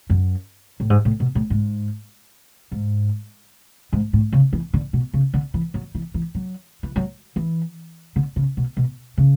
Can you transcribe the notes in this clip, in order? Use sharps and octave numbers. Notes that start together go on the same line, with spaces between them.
F#2
A2
G#2
A2
B2
A2
G#2
G#2
G#2
A2
C#3
E3
D3
B2
C#3
D3
E3
F#3
E3
E3
F#3
E3
F#3
E3
D3
C#3
B2
B2
C#3